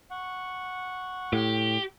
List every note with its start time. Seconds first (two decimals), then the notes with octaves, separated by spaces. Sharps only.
0.11 F#5 C#6
1.33 A2 G4